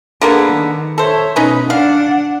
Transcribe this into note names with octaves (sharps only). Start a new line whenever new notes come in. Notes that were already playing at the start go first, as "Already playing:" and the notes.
D3 A#3 B3 G#4
D#3
A4 C5 C#5 E5
B2 C#4 D#4 B4
D4 F5 F#5